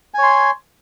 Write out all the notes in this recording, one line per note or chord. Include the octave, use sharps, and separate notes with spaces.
C#5 G#5 C6